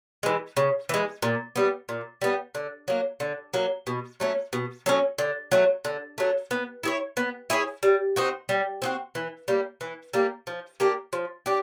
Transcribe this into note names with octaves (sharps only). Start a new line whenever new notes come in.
E3 G#3
C#3
E3 G#3
A#2
G3 B3
A#2
G3 B3
D3
F#3 A#3
D3
F#3 A#3
B2
F#3 A3 C#4
B2
F#3 A3 C#4
D3
F#3 A3
D3
F#3 A3
B3
E4 G#4 C#5
B3
E4 G#4 C#5
G3
C4 D#4 F#4
G3
C4 D#4 F#4
E3
G3 A#3
E3
G3 A#3
F3
A#3 D4 G4
F3
D4 G4